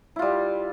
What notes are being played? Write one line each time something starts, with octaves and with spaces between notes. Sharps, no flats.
G3 E4 F4